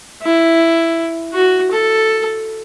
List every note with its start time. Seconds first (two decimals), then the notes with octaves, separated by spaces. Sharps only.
0.23 E4
1.34 F#4
1.71 A4